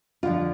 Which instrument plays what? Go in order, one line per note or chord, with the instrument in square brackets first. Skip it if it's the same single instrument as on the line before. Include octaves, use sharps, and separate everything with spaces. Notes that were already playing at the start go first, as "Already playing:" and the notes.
[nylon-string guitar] F2 D3 F3 F4